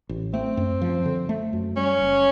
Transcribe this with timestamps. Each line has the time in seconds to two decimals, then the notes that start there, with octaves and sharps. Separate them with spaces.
0.09 A1
0.34 A3 C4
0.57 F#2
0.82 F3
1.06 D3
1.29 A3
1.53 F#2
1.76 G3 C#4
2.00 F#1